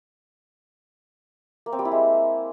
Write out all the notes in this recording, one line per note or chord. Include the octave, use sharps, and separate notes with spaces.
A#3
C4
G3
E4
G#3